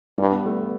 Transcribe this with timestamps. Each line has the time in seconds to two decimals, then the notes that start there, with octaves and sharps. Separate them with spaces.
0.18 G2 G3
0.32 B3
0.46 A3
0.55 B3